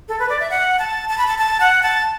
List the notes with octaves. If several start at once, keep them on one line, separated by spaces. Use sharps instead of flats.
A4
B4
D5
E5
F#5
A5
A5
B5
A5
A5
F#5
A5